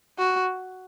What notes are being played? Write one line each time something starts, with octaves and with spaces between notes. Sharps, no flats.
F#4